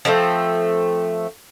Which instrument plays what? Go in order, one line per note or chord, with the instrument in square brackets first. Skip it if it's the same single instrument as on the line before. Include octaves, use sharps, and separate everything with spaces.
[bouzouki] F3 G#3 A3 C4